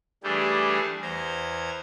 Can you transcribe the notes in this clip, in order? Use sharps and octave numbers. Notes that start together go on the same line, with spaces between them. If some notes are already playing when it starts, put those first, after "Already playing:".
E3 G3 A3 D4 G4 G#4
E2 C5 A#5 G#6